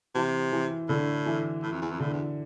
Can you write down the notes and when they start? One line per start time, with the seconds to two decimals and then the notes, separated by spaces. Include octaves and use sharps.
0.15 C3 E3
0.52 E3
0.89 A2 D3
1.26 E3
1.62 A2
1.72 F2
1.82 E2
1.91 F2
2.00 A2 D3
2.12 E2